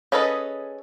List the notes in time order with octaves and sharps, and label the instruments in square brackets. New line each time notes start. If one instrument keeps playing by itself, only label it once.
[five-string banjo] C#4 G#4 A4 B4 D#5